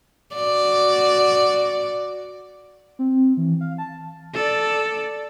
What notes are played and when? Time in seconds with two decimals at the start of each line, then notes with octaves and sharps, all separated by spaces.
0.36 F#4 D5
2.99 C4
3.37 E3
3.61 F5
3.78 A5
4.35 A4 D5